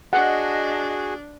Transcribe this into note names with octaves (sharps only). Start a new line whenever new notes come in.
D4 F#4 G#4 D#5 F#5 A5